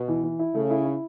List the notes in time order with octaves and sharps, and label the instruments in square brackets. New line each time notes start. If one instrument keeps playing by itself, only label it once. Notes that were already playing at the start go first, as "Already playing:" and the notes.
Already playing: [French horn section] B2
[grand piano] E3
E3
E4
[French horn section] C#3 [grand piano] A3
[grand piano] E4
E4